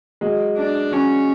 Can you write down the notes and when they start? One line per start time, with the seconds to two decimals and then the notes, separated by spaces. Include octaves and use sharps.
0.21 F#3 G#3
0.57 D4
0.92 F#3 C#4